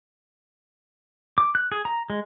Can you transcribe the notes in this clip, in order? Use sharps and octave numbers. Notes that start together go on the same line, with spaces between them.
D6
F#6
G#4
A#5
G#3